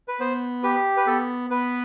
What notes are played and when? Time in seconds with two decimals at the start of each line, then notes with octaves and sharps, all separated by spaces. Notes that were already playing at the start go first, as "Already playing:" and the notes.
0.08 B4
0.20 B3 C5
0.63 G4 B4
0.97 B4
1.07 B3 A4
1.50 B3 B4